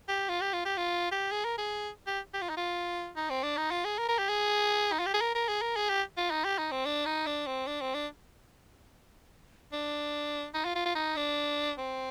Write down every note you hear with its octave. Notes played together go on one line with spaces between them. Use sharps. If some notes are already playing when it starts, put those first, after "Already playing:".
G4
F4
G4
F4
G4
F4
G4
G#4
A#4
G#4
G4
G4
F4
D#4
F4
D#4
C4
D4
D#4
F4
G#4
A#4
A#4
G4
G#4
D#4
F4
G4
G#4
A#4
A#4
G#4
A#4
G#4
G4
F4
D#4
G4
D#4
C4
D4
D#4
D4
C4
D4
C4
D4
D4
D#4
F4
F4
F4
D#4
D4
C4